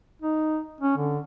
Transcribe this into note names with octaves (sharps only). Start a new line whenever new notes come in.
D#4
C#4
D3